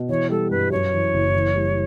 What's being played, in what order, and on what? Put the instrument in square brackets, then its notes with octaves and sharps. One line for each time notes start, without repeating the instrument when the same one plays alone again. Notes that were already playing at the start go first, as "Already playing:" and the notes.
Already playing: [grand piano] B2
[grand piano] E3 [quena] C#5
[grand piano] G3 [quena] A4
[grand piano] G2 [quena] B4
[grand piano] F#2 [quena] C#5
[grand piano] E3
F#1
E3
G3